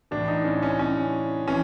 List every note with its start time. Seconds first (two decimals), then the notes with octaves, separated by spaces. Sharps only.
0.11 A2 E3 D4
0.28 D#4
0.45 C#4
0.63 C#4
0.79 C#4
1.48 E3 C#4